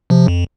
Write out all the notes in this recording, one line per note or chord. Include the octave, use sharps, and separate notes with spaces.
C3 F3
F2